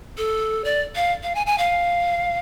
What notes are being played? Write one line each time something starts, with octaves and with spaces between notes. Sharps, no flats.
A4
D5
F5
F5
G#5
G#5
F5